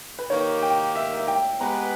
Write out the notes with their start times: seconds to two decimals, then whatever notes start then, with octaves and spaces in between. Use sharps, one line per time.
0.19 B4
0.30 D#3 A#3 D#4 G4 C#5
0.63 G5
0.96 E5
1.17 E5
1.28 G5
1.60 G#3 B3 G4 B4 A#5